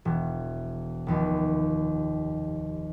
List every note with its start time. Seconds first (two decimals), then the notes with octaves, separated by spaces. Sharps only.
0.05 E1
1.07 F1 D#2